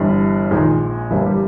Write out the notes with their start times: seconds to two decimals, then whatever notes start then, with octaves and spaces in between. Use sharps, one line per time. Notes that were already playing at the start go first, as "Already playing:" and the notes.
Already playing: G1 G2 E3 G3
0.50 A#1 A#2 D#3 G#3 D#4
1.11 G1 G2 E3 A#3 E4
1.26 G3 G4